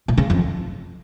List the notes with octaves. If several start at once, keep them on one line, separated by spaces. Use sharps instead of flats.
A#2
C#3
F2